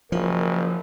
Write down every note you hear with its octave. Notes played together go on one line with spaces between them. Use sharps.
F#1 F3 A#4